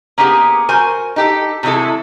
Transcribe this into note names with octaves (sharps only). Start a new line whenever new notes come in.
A#3 B3 C#4 E4 G4 G#4
F#4 A#4 C5 G#5
D#4 G4 A4
C3 E3 F#3 G#3 E4 A4